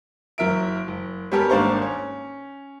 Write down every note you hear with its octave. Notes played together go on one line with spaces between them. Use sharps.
F#1 F#3 A#4 E5 D7
F#1
G3 B3 C#4 G4 A4 A#4
G#1 A#3 D4 C5 A#5 C#6
C#4